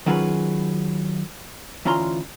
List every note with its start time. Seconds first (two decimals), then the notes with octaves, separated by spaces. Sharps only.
0.06 D#3 F#3 C#4 F4 G#4 B4
1.85 D2 E3 C#4 F4 A#5 C6